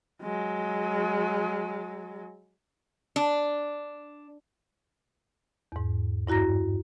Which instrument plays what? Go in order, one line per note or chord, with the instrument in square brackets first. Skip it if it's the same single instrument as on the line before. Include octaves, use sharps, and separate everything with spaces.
[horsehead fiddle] F#3 G#3
[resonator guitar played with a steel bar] D4
[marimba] E2 G#2
G2 E4 F#4 A#5 A#6